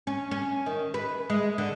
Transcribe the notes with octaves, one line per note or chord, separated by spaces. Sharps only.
C#4
C#4
D#3
B4
G#3
D3